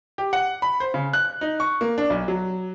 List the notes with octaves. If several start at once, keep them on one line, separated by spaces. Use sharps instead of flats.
G4
F#5
B5
C5
C#3
F#6
D#4
C#6
A#3
D4
B1
F#3